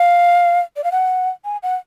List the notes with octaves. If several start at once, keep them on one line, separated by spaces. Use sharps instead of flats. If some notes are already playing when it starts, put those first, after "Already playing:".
Already playing: F5
D5
F5
F#5
G#5
F#5